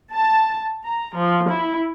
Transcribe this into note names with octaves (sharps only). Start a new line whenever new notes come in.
A5
A#5
F3
E4